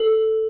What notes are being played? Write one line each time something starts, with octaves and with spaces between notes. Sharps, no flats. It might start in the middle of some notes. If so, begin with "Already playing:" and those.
Already playing: A4